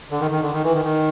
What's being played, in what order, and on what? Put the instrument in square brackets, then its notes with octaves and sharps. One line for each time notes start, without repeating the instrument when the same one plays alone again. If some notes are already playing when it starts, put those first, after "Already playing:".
[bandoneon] D3
D#3
D#3
D3
D#3
E3
D#3
D#3